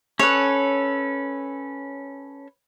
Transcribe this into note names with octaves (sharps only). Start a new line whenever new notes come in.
C#4 A4 B4 C#5